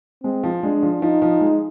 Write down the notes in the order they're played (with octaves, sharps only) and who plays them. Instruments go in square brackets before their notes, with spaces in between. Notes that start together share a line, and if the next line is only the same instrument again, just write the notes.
[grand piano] G#3 [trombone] C4
[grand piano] F3
[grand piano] G#3 [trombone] D4
[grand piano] F3
[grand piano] F3 [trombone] D#4
[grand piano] F3
G#3